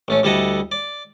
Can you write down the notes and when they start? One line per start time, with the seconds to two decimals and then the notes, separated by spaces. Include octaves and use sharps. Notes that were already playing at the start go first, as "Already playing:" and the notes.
0.08 A1 A3 C#4
0.23 D2 G3 E4 A4 D#5 F#5
0.72 D5